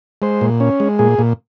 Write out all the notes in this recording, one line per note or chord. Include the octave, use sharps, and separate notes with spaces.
G#3 C5
A#2
C#4
G#3
A#2 G#4
A#2